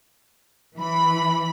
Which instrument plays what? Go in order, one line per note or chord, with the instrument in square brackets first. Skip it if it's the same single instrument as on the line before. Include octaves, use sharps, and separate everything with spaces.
[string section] E3 B5